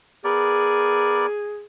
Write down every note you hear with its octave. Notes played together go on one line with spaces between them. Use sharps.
B3 G#4 A#4 D5